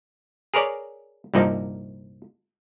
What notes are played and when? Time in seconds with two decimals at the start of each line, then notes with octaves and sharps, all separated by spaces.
0.54 G#4 A#4 B4 C#5 D5
1.34 C2 G2 A#2 F3 D#4